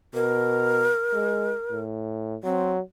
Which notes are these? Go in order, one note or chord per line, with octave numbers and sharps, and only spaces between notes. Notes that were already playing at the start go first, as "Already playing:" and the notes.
B2 A#4
G#3
A2
F#3 C4